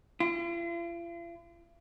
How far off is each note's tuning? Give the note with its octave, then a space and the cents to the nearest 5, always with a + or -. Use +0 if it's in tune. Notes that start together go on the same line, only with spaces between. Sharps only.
F4 -45